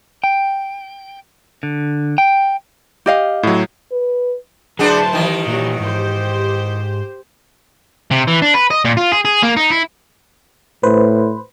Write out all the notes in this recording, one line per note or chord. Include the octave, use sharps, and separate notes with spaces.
G5
D3
G5
G4 D#5 F5
A2 F#3
B4
F#3 D4 E4 F#4 G#4 B4 C5 A5
D#3 E3 G3
A#2 F#3 G3 A#3
G#2 G4 C5
C3
E3
D4
B4
D#5
A#2
F4
G#4
G#4
A#3
D#4
E4
A2 B4 C5